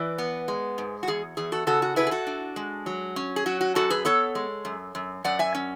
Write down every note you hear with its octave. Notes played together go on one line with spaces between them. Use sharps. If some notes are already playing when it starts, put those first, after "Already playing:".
Already playing: E3 B4 D5
B3
G#3
G#2
F#4
E2 G#4
E2 G#4
F#4 A4
C#3 F#4 A4
F#4
E4 G#4 B4
G#4
F#4 A4
D4
G#3
F#3
C#4
G#4
F#3 F#4
F#4
F#2 F#4 A4
G#4 B4
B3 A4 C#5
G#3
F#2
F#2
F#2 D5 F#5
E5 G#5
C#4